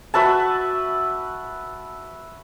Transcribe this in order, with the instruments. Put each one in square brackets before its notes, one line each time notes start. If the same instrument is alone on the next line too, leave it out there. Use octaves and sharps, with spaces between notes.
[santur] F#4 B4 E5 A5